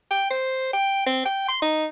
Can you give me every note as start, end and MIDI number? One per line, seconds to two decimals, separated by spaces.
0.10 0.28 79
0.30 0.69 72
0.73 1.06 79
1.06 1.21 60
1.25 1.46 79
1.48 1.59 84
1.62 1.85 63